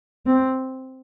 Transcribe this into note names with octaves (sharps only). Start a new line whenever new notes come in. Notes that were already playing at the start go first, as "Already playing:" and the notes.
C4